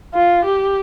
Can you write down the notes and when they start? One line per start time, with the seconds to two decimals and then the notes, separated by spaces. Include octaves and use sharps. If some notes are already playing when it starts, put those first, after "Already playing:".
0.14 F4
0.45 G4